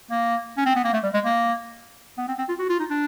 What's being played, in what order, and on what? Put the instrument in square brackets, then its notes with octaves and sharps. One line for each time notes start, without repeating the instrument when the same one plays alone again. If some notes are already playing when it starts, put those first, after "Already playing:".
[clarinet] A#3
C#4
C4
B3
A#3
A3
G3
G#3
A#3
B3
C4
C4
F4
F#4
F4
D#4
D4